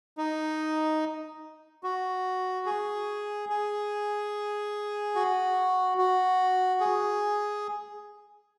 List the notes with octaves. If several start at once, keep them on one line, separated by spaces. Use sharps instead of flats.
D#4
F#4
G#4
G#4
F#4
F#4
G#4